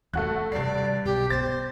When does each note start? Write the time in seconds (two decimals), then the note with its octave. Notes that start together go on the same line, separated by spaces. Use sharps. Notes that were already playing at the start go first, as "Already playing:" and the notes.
0.13 D#2 A3 F#4 F#6
0.52 G2 C3 G3 D5 C7
1.05 B1 G4
1.30 B3 C5 A6